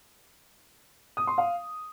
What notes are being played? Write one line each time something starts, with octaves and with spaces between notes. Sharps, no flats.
D#6
C6
F5